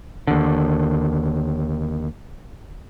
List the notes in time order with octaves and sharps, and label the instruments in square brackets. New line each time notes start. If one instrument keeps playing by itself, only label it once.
[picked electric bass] D#2 D3